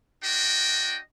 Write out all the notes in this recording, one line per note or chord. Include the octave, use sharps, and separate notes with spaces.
D4 F#4 D#5 G5